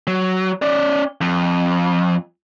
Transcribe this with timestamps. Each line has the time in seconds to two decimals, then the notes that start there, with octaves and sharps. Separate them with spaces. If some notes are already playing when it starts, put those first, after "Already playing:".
0.07 F#3
0.62 C#4 D5
1.21 F2